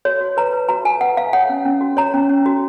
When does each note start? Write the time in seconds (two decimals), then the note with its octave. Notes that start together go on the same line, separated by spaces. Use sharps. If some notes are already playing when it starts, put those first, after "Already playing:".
0.05 F#4 C#5
0.21 F#4
0.37 B4 A#5
0.53 B4
0.69 F#4 A#5
0.85 F#4 G#5
1.01 B4 F#5
1.17 B4 F5
1.33 C#5 F#5
1.49 C#4
1.65 C#4
1.81 F#4
1.97 C#5 A#5
2.14 C#4
2.29 C#4
2.46 F#4